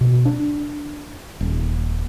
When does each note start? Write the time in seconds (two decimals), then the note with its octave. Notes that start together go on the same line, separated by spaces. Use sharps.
0.01 B2
0.25 D4
1.41 D#1